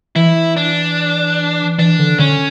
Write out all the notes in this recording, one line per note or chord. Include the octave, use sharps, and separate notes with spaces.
E3 E4
D4
E3 D4
D3
D3 C#4